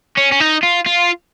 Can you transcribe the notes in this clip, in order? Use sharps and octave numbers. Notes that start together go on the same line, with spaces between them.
C#4
C#4
D#4
F4
F4